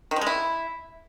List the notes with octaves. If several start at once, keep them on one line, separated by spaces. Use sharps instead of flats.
D#3
F3
G#3
E4